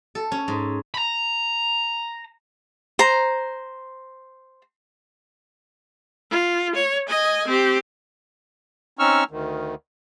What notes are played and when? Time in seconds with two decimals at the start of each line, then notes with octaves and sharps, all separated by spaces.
0.15 A4
0.32 C#4
0.48 G#2
0.94 A#5 B5
2.99 C5 A#5
6.31 F4
6.75 C#5
7.08 D#5 G#5
7.47 C4 G4
8.99 C4 C#4 D#4 C#6 E6 F6
9.31 D2 D#3